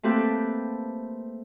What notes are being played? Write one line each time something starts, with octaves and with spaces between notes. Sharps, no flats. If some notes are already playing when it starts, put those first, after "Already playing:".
A3 A#3 C4 G4 A4 B4